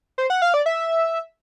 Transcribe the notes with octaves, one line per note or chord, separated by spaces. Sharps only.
C5
F#5
F5
D5
E5